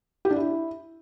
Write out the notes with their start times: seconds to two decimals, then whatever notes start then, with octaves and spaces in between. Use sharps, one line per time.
0.25 G4
0.31 D4
0.36 E4